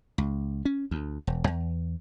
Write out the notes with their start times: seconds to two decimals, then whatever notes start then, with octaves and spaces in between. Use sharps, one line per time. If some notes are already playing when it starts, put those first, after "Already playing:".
0.18 C#2
0.65 C#4
0.91 D2
1.27 E1
1.47 E2